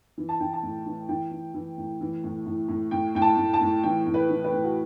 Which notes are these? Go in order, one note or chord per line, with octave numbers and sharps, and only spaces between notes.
E3
A5
E3 G5
A5
A2
E3
E3 G5
E3
E3
A2
E3
A2
A2
A2
A2 G5
A2 G5
A5
A2
A5
A2
E3 G5
A2
B4
E3
B4
A2
F#4